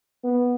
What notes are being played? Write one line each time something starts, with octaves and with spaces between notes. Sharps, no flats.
B3